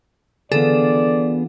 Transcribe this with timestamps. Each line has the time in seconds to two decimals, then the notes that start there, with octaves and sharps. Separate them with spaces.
0.52 D3 E3 B3 F4 G#4 A4 D5